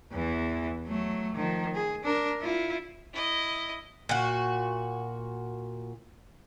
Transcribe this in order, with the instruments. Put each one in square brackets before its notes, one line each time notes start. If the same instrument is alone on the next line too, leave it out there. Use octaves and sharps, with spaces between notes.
[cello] E2 E3
F#3 A3
D#3 F3
G#4
D4 A#4
E4 F4
[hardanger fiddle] E4 D#5
[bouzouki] A#2 F#4